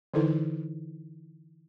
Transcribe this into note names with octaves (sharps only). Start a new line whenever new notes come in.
D3 E3 D#4 E4 A4 B4